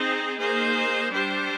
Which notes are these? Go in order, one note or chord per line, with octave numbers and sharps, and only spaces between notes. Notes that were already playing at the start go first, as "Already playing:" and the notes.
Already playing: C4 D#4 G#4 C5
A#3 D#4 G#4 C5
G3 D4 G4 C5